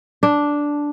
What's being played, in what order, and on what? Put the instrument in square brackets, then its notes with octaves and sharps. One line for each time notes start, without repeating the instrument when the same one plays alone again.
[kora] D4